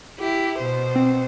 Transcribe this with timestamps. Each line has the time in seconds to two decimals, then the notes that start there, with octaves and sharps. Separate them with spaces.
0.18 E4 G4
0.58 B2 C5
0.96 C4